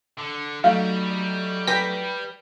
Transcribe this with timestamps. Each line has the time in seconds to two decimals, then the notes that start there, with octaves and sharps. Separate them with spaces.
0.19 D3
0.64 F#3 G3 A3 D#4 F5
1.67 B4 G5 A#6 B6